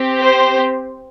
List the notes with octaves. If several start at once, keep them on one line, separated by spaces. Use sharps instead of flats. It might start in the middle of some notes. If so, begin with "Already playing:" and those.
Already playing: C4 G4
C5